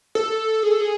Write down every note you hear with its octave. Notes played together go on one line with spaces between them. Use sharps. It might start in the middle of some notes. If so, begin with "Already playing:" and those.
A4
G#4
A4
G#4